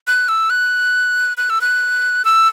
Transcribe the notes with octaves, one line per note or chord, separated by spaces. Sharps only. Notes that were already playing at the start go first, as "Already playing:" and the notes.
F#6
E6
F#6
F#6
E6
F#6
E6